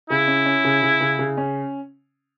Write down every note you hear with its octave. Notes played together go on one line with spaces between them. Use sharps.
C#3 E4
C#4
C#4
C#3
C#3
C#3
C#3
C#4